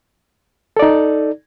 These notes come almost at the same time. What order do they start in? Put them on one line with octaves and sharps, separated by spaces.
A4 D5 D#4